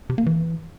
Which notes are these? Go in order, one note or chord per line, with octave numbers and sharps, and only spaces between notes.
C3
A#3
E3